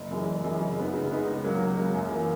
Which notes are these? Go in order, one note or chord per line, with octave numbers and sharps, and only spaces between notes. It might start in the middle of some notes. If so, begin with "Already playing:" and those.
Already playing: F#1
F#2 E3 G#3
F#1
F#2 E3 G#3
C#3
G#3 B3 D#4
C#3
G#3 B3 D#4
C#2
C#3 F#3 A#3
C#2
C#3 F#3 A#3
F#2
E3 A#3